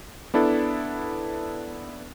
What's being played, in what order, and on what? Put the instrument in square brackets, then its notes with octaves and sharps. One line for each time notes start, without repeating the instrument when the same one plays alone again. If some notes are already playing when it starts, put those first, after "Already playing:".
[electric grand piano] B3 D4 E4 A4